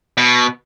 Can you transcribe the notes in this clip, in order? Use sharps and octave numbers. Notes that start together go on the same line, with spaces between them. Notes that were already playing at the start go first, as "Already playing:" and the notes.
B2